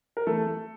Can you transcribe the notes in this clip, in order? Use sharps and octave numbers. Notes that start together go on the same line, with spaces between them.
A#4
E3 A3 A4
A3